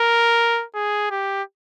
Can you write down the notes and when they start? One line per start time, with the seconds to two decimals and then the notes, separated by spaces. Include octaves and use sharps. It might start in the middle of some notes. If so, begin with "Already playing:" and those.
Already playing: A#4
0.75 G#4
1.11 G4